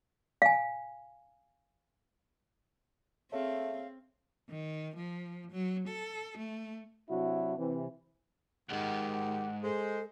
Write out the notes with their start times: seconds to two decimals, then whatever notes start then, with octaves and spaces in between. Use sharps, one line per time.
0.42 F5 G#5
3.32 A3 C4 G#4 C#5 F5
4.49 D#3
4.96 F3
5.51 F#3
5.88 A4
6.38 A3
7.10 C3 F#3 D4 E4 F#4
7.59 C3 E3
8.69 C#2 G#2 D#3 G#3 G4 F#5
9.13 F#5
9.63 G#3 A4 C5